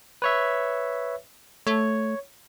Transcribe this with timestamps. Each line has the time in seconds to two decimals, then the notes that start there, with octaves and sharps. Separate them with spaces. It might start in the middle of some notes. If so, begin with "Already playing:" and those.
0.22 B4 C#5 E5
1.67 A3 C#5